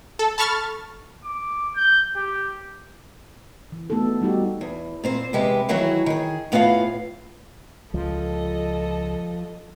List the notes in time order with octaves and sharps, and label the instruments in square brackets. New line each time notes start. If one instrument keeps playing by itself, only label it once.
[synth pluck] A4
A5 B5 C#6 F6 A6
[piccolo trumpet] D6
G6
G4
[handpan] E3
A3 B3 D#4 F#4 A4
G3 D#4 F#4 G4
[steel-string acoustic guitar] E2
A#2 C4 C5
E2 C3 G#3 G4 B4
D#3 E3 F#3 E4 F#4 G#4
D#3 G#4
A2 B3 F4 G#4 D5 F5
[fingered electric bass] C#2 [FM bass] F3 [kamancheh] A4 D#5